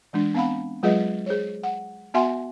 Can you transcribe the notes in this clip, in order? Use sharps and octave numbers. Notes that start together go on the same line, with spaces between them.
E3 G#3 D4
B3 C4 F5 F#5 B5
F#3 G#3 F4 G#4 B4 D#5
G#4 C5 C#5
F#5
B3 F#4 E5 F#5 G#5 C6